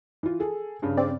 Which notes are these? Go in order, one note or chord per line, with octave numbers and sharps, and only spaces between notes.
E3 F4
G#4 A4
G2 C#3
C4 D5